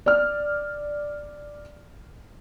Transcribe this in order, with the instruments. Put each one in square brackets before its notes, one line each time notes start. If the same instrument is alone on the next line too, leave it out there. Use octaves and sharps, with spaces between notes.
[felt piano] D5 F6